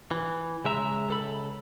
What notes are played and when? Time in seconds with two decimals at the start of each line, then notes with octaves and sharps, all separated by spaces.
0.11 E3
0.64 C#3 G#3 E5 A#5
1.08 C#2 A4 B5